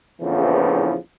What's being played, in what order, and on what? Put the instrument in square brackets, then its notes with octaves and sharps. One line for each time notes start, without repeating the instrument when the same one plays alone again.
[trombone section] A#1 E2 A2 C#3 E3 F3